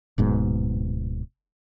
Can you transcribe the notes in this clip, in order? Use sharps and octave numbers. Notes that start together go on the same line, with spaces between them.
D1 G#2 B2